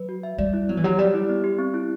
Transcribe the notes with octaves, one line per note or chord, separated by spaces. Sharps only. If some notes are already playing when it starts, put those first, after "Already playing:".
Already playing: F#3 B4
F#4
E5
G3 D5
E4
F#3 B3
E3
F#3 G4
G3 D5
E4
B3
G4
C4
E4